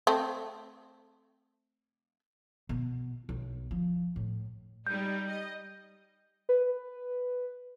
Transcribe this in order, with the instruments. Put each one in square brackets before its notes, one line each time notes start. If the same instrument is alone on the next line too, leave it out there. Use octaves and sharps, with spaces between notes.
[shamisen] A3 C4
[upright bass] B2
B1
F3
A2
[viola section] G3 D#4 [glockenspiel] G6
[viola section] D#5
[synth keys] B4